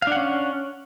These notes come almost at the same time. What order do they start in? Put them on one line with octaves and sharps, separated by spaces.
F5 D4 F#5 C#4